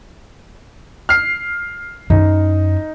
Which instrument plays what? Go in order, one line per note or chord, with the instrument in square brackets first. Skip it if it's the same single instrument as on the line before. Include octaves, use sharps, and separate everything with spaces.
[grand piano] F6 C7
[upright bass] F#2 E4 [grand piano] D#4